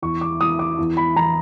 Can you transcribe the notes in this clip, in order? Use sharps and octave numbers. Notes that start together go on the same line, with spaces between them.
E2 C#6
D6
E3 D#6
D6
E2
B5
E3 A#5